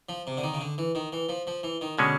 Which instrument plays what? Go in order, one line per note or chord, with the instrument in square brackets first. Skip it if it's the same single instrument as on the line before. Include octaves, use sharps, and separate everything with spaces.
[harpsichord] F3
C3
D3
D#3
C#3
D3
E3
D#3
E3
F3
F3
E3
D#3
[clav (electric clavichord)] B2 G#3 C#4 [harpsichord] D3